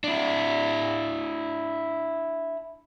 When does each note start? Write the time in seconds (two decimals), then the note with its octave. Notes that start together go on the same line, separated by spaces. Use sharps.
0.04 D4 E4